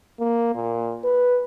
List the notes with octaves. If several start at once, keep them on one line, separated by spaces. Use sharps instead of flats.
A#3
A#2
B4